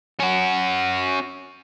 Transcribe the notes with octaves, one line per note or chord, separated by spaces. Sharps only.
C#4 F#4